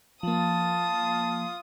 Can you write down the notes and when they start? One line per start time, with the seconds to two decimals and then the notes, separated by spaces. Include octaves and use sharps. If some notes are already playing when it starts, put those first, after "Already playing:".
0.23 F3 A#3 F4 A5 D#6